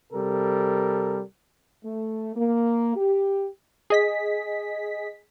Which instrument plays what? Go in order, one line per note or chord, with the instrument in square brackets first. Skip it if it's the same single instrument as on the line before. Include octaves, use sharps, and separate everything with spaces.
[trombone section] C3 G3 A4 A#4
[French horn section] A3
A#3
G4
[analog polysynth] G#4 D#5 B6